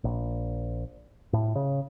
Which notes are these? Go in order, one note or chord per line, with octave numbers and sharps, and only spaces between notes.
A#1
A2
C#3